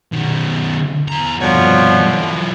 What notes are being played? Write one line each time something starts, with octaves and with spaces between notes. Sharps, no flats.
B2 D#3
E2 A#5
G2 B2 D3 F3 C#5
E3 F#3